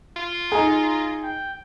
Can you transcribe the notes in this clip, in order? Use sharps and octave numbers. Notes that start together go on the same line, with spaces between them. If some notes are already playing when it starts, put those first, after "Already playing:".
F4
D#4 G#4 A#5
G5